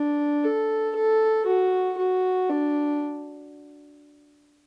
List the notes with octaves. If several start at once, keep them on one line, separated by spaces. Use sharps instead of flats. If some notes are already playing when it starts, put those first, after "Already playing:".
Already playing: D4
A4
A4
F#4
F#4
D4